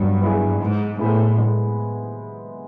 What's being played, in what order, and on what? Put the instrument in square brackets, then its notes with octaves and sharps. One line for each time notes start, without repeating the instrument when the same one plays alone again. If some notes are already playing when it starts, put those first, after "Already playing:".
Already playing: [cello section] G2 [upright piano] F#3 B3
[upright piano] B3 E4 G#4
[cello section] G#2 [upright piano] G#3
[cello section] A2 [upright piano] B3 E4 G#4 C5
[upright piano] G#3